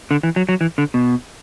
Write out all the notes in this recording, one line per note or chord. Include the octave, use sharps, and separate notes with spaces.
D3
E3
F#3
F#3
E3
D3
B2